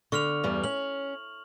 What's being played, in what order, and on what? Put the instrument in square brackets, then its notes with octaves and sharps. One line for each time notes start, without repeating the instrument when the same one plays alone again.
[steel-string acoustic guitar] D3 [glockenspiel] C#6 F6 F7
[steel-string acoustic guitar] E2 G2 G3
[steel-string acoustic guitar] C#4 [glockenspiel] F#7